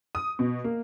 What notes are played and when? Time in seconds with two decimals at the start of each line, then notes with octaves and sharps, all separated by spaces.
0.15 D#6
0.39 B2
0.64 A#3